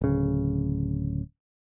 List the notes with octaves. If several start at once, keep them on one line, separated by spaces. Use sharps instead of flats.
D1 C#3